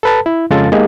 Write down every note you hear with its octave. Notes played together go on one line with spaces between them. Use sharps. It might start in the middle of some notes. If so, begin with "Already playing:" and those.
A4 B4 A5
E4
F2 C#3 G#3 F4 A4 A6
G#3 A#3 B3 D#4 G4 G#4